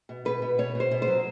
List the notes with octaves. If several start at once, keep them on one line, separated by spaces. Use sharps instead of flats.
B2
B2 B4
B2
B2 C#5
B2
C5
B2
C5
F#3